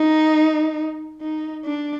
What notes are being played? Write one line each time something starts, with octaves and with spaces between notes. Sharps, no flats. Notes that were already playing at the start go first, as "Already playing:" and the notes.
Already playing: D#4
D#4
D4